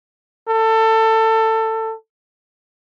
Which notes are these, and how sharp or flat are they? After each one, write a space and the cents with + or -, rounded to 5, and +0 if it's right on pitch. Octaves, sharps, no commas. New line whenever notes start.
A4 +20